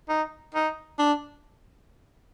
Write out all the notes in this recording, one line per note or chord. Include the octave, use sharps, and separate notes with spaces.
D#4
D#4
D4